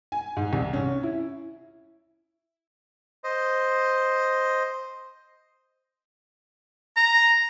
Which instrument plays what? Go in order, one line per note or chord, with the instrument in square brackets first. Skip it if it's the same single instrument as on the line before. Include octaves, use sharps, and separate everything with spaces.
[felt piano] G#5
G#2
C2
C#4
E4
[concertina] C5 D#5
[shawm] A#5